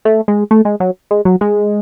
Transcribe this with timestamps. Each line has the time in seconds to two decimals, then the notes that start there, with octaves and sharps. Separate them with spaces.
0.05 A3
0.28 G#3
0.51 A3
0.65 G#3
0.80 F#3
1.11 G#3
1.25 F#3
1.41 G#3